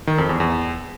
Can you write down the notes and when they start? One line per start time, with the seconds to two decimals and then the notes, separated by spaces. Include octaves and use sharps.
0.07 D#3
0.18 F2
0.29 E2
0.40 E2